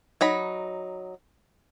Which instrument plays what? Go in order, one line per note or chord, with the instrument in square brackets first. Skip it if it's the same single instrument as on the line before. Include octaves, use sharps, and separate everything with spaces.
[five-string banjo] F#3 D#4 B5